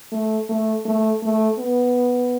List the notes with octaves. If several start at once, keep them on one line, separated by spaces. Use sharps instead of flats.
A3
A3
A3
A3
B3